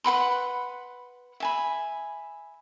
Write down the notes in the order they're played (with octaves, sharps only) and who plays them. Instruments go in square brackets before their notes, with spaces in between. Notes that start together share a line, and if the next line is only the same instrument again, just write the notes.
[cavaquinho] B4 F#5 B5 C6
E5 G#5 B5